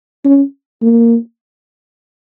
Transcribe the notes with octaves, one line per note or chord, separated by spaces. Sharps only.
C#4
A#3